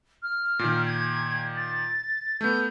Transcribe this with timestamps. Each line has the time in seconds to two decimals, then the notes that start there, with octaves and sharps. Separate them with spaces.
0.23 F6
0.59 A#2 D#3
0.86 G#6
1.56 A6
2.41 A3 B3 G6